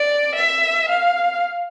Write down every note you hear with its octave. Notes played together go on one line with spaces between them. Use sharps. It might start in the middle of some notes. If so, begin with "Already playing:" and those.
Already playing: D5
E5
F5